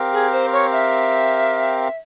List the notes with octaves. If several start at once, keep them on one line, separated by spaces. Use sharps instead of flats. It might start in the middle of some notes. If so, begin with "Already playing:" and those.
Already playing: C4 G4 A#4 F5
G#4
C5
C#5
E5